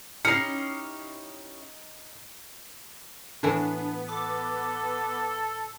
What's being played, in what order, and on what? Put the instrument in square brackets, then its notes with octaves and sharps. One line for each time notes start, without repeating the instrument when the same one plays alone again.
[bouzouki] C#4 E4 G4 [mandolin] D#4 [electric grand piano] F6 C7 [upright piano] C#7
[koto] A2 E3 [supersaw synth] B3 [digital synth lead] D4
[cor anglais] A4 [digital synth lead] D6